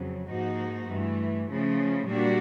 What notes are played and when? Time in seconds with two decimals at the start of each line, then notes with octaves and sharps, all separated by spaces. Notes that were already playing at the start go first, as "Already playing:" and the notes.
Already playing: F2 C#3 F#3
0.27 G#2 F3 A#3 D#4 F#4
0.87 G2 E3 A3
1.48 C#3 F3 A3
2.07 A#2 G3 A#3 D4 F#4